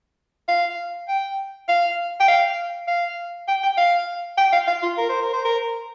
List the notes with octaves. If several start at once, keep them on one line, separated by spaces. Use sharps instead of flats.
F5
G5
F5
G5
F5
F5
G5
G5
F5
G5
F5
F5
F4
A#4
C5
A#4
C5
A#4